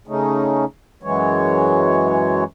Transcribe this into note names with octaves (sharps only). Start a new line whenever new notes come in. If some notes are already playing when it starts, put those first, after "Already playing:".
C#3 A3 C#4 D#4
F#2 E3 F#3 G#3 C#5